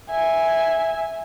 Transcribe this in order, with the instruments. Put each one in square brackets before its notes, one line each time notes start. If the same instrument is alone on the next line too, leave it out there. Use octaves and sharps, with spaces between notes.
[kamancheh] E5 G#5